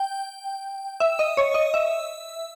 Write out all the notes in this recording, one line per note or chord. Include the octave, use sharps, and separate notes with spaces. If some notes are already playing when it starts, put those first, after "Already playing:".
Already playing: G5
E5
D#5
C#5
D#5
E5